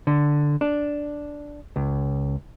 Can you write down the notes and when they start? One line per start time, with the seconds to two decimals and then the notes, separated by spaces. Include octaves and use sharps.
0.07 D3
0.61 D4
1.76 C#2